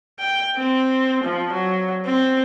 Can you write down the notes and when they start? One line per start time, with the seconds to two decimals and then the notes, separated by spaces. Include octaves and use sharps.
0.20 G5
0.57 C4
1.24 F3
1.53 F#3
2.06 C4